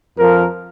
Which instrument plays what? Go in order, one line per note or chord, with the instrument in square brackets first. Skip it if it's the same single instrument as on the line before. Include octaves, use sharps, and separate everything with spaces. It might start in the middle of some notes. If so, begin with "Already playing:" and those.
[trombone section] F2 F3 A#4